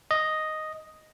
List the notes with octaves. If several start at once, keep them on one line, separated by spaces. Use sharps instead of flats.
D#5